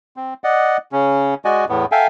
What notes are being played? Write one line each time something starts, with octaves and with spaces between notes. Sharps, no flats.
C4
D5 D#5 F#5
C#3 C#4
G#3 F#4 D5 D#5 G#5
E2 A2 B3
A4 E5 F5 G5 G#5